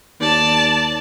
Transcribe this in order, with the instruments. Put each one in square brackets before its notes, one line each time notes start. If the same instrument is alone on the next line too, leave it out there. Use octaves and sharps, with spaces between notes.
[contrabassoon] D#2 [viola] D5 A5